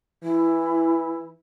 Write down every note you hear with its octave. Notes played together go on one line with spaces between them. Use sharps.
E3 E4